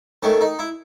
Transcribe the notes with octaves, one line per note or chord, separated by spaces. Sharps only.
D#3 A3 C#4
D#4
E4